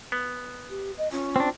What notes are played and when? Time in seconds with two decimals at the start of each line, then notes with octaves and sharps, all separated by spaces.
0.12 B3
0.70 G4
0.98 D#5
1.12 C#4 F4
1.36 C4 D4